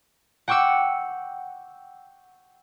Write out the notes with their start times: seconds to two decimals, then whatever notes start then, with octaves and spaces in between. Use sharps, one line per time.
0.48 F#5 G5 C#6 D6 E6 C#7